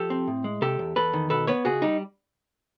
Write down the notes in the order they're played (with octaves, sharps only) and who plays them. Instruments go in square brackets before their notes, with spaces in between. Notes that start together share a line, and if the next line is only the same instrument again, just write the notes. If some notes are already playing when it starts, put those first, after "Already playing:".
Already playing: [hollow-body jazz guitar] F3 G4 A4
C4
A2
G#3
C3 G4 A4
E2
E2 A4 B4
D#3
B2 A4 B4
B3 B4 C#5
C#2 F#4 G#4
G3 D#4